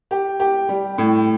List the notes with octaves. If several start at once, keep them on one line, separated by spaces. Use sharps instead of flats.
G4
G4
G3
A2